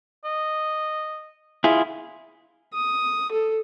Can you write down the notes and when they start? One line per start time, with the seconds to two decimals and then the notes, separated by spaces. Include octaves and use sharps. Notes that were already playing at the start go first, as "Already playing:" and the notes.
0.24 D#5
1.64 E4 F4 G#4
2.73 D#6
3.32 A4